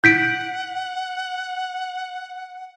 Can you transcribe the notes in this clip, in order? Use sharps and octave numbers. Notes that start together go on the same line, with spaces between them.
F#5 G6 B6 D7